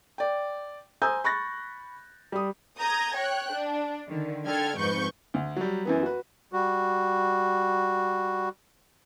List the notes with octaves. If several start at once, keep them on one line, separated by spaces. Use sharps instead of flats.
D5 G5
C5 G#5 A#5 D#6 E6 G6
B5 C#6 F#6 A6 A#6
G3 D#6
A#5 D#6 G6 G#6 A#6
C#5 G5 F#6
D4
D3 D#3
D3 A4 G5 F6 G#6
G1 F2 G#2 B4 C#6 G6
D2
F#3 G3
F#2 E3 B3
F#4 B4
G3 F#4